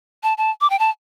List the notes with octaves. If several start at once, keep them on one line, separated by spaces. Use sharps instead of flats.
A5
A5
D6
G5
A5